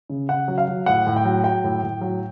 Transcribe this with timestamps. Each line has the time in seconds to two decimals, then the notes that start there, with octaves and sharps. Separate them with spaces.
0.10 C#3
0.29 C#3 F#5
0.48 F#3
0.58 F5
0.68 F#3
0.86 A2 F#5
1.07 A2
1.16 G5
1.25 F#3
1.44 F#3 G5
1.64 A2
1.83 A2
2.01 F#3